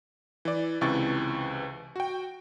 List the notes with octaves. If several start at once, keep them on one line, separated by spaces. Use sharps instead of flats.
E3 D5
C#2 C3 E3 C#6 A6
F#4 G5